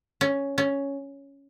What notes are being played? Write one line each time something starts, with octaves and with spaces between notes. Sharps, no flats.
C#4
C#4